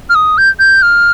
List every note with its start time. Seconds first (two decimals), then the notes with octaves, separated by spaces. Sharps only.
0.10 F6
0.15 D#6
0.38 G6
0.59 G6
0.82 F6